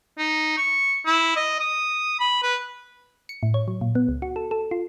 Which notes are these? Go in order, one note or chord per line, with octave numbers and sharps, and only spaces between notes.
D#4
C#6
E4
D#5
D#6
B5
B4
C#7
A2
C#5
F#3
A#2
B3
C#2
F#4
A4
A4
F4